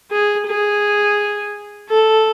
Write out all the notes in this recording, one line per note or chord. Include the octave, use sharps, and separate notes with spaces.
G#4
G#4
A4